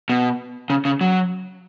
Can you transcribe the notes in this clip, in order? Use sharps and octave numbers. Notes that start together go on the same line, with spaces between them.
B2
C#3
C#3
F#3